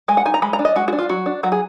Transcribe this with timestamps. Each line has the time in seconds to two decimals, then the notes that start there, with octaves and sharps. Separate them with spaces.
0.08 G#3 G#5
0.17 F#5
0.25 D#4 G#5
0.34 A#5
0.42 G#3 B5
0.53 A#5
0.59 D4
0.65 D#5
0.76 G#3 F#4
0.88 F#4
0.93 D4
0.98 F4
1.09 F#3 F#4
1.26 D4
1.43 F#3 F#4
1.52 G#4